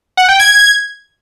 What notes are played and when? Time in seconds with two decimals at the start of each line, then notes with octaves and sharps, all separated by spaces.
0.17 F#5
0.28 G5
0.40 G#6